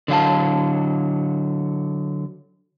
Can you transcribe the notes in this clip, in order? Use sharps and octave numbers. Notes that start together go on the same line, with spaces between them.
D3 F#3 F5 A5